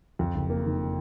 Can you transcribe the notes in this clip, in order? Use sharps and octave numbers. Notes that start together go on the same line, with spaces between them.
F2
F#1
A#3
D#3